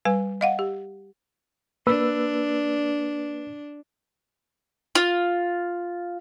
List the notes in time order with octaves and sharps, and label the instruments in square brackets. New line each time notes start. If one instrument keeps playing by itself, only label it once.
[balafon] G3 B4 G#5
D#5 F5 F#5
G4
[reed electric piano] A#3 B4 E6 [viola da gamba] D4
[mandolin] F4